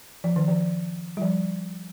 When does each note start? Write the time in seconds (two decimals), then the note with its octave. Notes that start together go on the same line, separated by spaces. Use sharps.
0.24 F3
0.36 D#3
0.48 F3
1.17 G3
1.22 F3